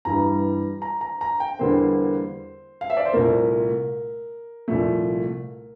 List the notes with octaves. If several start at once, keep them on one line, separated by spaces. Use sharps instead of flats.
G2 E3 G3 A#5
A#5
A#5
A#5
G5
E2 D3 G3 A#3 C5
F5
E5
D5
C5
C2 A#2 A3 A#4
C2 A#2 F3 A3